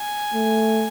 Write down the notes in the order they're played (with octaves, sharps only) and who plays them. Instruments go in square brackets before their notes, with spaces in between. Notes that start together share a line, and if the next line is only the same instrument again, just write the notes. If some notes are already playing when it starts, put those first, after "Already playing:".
Already playing: [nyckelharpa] G#5
[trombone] A3